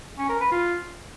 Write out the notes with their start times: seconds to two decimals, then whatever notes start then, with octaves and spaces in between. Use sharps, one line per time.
0.18 C#4
0.29 A#4
0.40 B4
0.52 F4